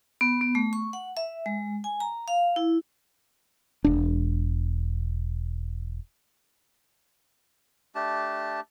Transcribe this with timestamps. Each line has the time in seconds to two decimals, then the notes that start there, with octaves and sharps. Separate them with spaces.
0.21 B3
0.41 B3
0.55 A3
0.73 C#6
0.93 F#5
1.17 E5
1.46 G#3
1.84 G#5
2.00 A#5
2.28 F5
2.56 E4
3.84 E1 D4
7.95 A3 D4 G4 A5